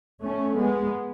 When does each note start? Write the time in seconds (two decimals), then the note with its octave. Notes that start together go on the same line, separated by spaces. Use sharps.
0.22 A3 C#4
0.55 G#3 B3